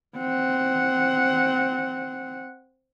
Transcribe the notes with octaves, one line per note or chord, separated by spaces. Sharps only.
C4 F#5